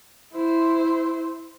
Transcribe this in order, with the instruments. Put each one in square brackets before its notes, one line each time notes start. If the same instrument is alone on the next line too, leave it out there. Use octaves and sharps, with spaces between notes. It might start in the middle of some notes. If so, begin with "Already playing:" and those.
[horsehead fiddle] E4 C5